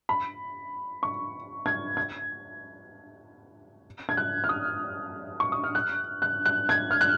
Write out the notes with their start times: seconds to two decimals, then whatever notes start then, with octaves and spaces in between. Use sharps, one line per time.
0.09 B5
1.03 C#6
1.66 G#6
1.97 G#6
4.09 G#6
4.17 F#6
4.44 F6
4.49 D#6
5.40 C#6
5.52 D#6
5.64 F6
5.75 F#6
6.22 F#6
6.45 F#6
6.69 G#6
6.91 F6
7.01 F#6